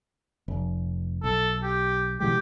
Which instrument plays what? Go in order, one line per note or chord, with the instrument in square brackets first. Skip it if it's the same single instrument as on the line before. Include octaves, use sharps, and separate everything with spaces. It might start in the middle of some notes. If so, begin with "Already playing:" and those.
[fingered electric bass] F1
[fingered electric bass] B1 [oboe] A4
[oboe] G4
[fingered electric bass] B2 E3 G#3 [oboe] G4